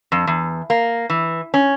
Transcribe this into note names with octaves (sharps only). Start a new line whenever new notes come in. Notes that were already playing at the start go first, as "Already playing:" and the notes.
F2
E2
A#3
E3
C#4